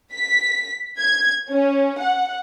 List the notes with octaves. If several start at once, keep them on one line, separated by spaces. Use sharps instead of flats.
B6
G#6
C#4
F#5